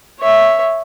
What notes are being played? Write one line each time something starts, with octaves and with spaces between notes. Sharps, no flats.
C#5 E5